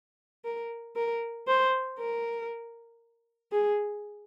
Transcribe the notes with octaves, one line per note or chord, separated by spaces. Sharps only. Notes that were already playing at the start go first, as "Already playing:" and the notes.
A#4
A#4
C5
A#4
G#4